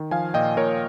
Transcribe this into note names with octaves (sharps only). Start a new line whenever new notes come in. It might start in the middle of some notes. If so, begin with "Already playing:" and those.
Already playing: D#3
F3 F5 G#5
A#2 D#5 G5
A#2 A#4 C#5